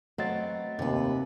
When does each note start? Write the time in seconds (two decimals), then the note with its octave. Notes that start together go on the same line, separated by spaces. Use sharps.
0.18 F#3 A3 B3 C4 D#5 F5 A6
0.79 D#2 C3 B4